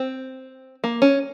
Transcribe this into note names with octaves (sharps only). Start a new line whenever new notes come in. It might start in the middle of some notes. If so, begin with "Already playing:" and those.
Already playing: C4
A#3
C#4